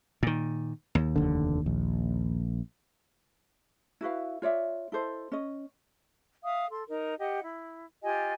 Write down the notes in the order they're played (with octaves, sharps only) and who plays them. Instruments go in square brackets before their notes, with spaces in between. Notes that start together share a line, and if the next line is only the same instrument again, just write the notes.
[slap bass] A#2 D#3
D#2
[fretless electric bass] F1 A#1 D3
A#1
[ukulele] E4 F#4 B4 F5
F4 C#5 D5 E5
E4 A4 C5 D#5
C#4 D#5
[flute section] E5 F5 D#6
A4 C6
D#4 A#4
G4 D#5 F#5
E4
F4 G4 D#5 G#5